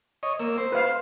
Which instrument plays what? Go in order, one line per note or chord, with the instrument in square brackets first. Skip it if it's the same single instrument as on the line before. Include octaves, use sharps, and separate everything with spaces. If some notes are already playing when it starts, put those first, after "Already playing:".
[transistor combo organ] C#5 D#5
A#3 E6
C5
[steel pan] B4 F5